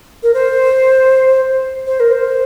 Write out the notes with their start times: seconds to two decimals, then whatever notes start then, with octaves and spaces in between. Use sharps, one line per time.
0.23 A#4
0.34 C5
1.87 C5
2.00 A#4
2.12 C5